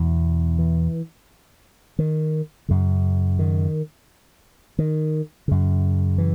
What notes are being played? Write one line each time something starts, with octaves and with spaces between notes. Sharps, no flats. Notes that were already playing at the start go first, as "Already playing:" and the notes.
Already playing: E2 B2
E3
D#3
F#2 C#3
D#3
D#3
F#2 C#3
E3